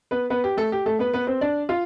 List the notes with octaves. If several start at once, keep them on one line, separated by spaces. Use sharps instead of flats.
B3 B4
B3 B4
G4
A3 A4
G4
A3 A4
B3 B4
B3 B4
C4 C5
D4 D5
F4 F5